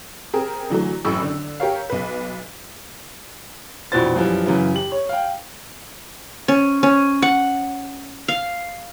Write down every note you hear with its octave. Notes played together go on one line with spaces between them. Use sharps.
C4 G4 G#4 A#4
D3 E3 F#3 A3
A1 F#2 A2 B5 C#6 E6
D3
G4 A#4 C#5 F5
B1 B4
A#1 F2 B2 E3 C5 A6
F#2 E3 F3 G3
F#2 C#3 E3
G4 F#7
C#5
F5 G5
C#4
C#4
F#5
F5